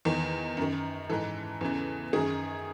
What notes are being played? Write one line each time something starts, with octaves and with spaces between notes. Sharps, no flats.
E2 D#3
F#2 D#3
G#2 E3 A4
E2 C#3 E3
F#2 D#3 G#4